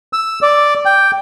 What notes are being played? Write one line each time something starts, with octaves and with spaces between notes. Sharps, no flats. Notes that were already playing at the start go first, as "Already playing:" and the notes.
E6
D5
G5